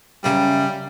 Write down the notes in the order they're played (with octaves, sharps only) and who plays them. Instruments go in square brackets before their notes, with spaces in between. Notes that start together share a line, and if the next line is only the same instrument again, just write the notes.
[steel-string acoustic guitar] F#2 C#3 [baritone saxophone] G3